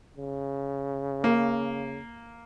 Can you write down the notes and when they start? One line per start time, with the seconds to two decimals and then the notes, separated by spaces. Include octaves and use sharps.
0.17 C#3
1.24 A#3